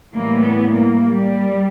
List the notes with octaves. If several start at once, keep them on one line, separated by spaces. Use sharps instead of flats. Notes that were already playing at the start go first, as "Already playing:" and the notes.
A2 E3 G3 A#3
B3
A#3
G3